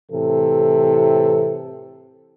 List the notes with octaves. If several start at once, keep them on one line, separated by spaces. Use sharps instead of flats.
A2 C3 E3 A4